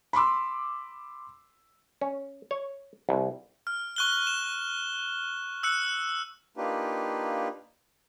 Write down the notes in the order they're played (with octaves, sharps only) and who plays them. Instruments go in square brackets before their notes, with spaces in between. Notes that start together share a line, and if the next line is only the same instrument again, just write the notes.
[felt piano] B5 C6 D6 E6
[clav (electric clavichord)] C#4
C#5
C2
[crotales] F6
C#6 F#6 G7
E7
E6 F#6 C#7
[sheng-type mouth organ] A#3 D4 D#4 F4 G4 B4